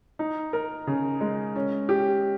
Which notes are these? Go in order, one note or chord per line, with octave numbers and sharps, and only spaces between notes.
D#4
A#4
C#3
G#3
C#4
G4